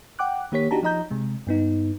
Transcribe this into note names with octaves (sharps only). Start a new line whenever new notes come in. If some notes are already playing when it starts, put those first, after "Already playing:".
F#5 G5 D6 F#6
D#3 A#3 G4 C#5 B6
D4 D#4 F#4 G4 A5 A#5
F3 D#4 D#5 A#5 G6
C3 G#3
G2 B3 D#4